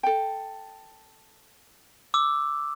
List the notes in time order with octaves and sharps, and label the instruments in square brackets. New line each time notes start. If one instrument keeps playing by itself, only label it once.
[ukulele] A4 G5
[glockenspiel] D6 E6